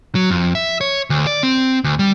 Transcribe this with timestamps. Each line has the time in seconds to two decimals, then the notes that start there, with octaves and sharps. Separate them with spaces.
0.15 F#3
0.31 F2
0.55 E5
0.81 C#5
1.10 D2
1.27 D5
1.43 C4
1.84 D2
1.99 G3